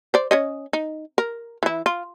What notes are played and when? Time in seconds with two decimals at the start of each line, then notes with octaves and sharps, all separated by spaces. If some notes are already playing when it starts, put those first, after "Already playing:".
0.14 C5 D5
0.31 C#4 C#5 D#5
0.73 D#4
1.18 A#4
1.63 E3 E4
1.86 F4